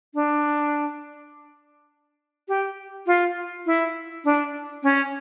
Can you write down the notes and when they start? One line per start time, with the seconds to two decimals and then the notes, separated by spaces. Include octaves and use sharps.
0.15 D4
2.48 G4
3.07 F4
3.66 E4
4.25 D4
4.83 C#4